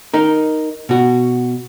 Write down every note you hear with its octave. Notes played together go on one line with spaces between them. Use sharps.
D#4 A#4
B2 F#4